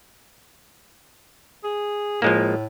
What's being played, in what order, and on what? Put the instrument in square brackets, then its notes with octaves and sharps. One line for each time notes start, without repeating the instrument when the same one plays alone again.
[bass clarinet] G#4
[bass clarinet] A2 [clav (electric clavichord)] F3 G#3 A#3